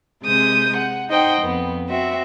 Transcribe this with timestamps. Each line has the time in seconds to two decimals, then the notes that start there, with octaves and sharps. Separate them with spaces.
0.23 C3 G#3 D#6 G6
0.76 F#5
1.08 D#4 C5 D#5 F#5 G5
1.41 F2 B3
1.89 C4 F#4 E5